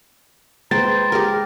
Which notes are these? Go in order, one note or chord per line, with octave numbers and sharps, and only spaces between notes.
G#3 B4 C5 G5 A#5 A6
G4 G#4 A#4